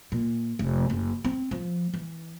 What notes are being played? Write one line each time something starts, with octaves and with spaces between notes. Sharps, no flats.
A#2
F1
F#1
C4
F3
E3